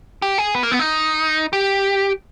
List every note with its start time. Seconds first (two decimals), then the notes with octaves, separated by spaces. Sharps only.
0.22 G4
0.38 G#4
0.55 B3
0.63 A#3
0.71 B3
0.79 D#4
1.53 G4